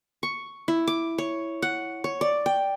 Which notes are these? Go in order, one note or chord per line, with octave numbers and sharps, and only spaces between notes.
C#6
E4
D6
C#5
F#5
C#5
D5
G5